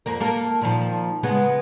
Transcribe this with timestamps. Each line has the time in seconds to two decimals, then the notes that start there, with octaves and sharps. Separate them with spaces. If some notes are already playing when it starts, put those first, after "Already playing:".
0.06 F2 A#3 A#4
0.20 A#3 A4 A#4
0.61 A#2 D#3 F3
1.23 C#3 G#3 B3